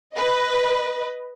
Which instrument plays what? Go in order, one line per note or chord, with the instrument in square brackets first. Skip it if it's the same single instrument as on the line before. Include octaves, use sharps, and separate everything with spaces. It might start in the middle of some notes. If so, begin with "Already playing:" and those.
[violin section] B4 D#5